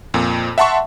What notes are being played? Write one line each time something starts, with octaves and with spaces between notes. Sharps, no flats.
F2 A#2
E5 F#5 A5 C6 C#6